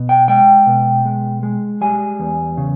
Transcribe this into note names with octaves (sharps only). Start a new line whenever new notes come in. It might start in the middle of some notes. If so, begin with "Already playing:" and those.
Already playing: B2
G5
G#3 G5
B2
G#3
G#3
G3 G#5
E2
C#3